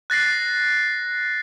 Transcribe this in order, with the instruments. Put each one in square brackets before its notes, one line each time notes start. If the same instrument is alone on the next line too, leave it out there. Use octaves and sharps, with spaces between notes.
[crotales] F#6 A6 A#6 C7